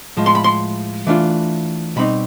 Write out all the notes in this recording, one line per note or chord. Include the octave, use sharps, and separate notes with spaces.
A2 F3 G#3
C6
B5
C6
E3 A3 D4 F4
B2 G3 C4 D#4 B5